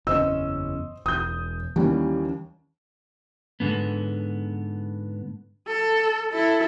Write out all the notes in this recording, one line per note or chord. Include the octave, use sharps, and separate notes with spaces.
F#1 E2 C#4 C5 D#5 E6
E1 D#6 G6
D#2 E3 G3 C#4
G#2 D3 B3
A4
E4 A4